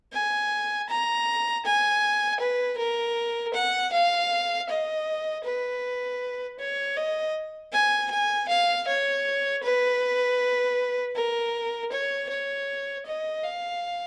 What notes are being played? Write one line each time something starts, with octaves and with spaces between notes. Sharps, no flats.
G#5
A#5
G#5
B4
A#4
F#5
F5
D#5
B4
C#5
D#5
G#5
G#5
F5
C#5
B4
A#4
C#5
C#5
D#5
F5